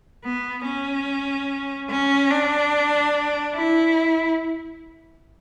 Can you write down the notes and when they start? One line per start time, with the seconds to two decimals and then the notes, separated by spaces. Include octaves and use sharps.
0.25 B3
0.66 C#4
1.91 C#4
2.31 D4
3.55 E4